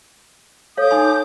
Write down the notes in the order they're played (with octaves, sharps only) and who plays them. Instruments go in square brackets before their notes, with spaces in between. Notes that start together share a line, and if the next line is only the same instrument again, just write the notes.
[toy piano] A4 C#5 F5 [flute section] D6 D#6 G6
[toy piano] D#4 G#5 C6